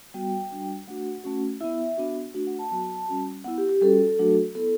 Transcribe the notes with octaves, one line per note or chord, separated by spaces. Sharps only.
G3 B3 F#4 G5
G3 D4 F#4
A3 D4 F#4 F#5
A3 C#4 F#4
B3 E4 E5
B3 D4 F#4
A3 D4 F#4
F#5
A5
F#3 B3 F#4 A5
G3 C#4 F#4
B3 E4 F#5
G4
G4
G3 C#4 F#4 A4
F#3 A3 D4 F#4
B3 E4 A4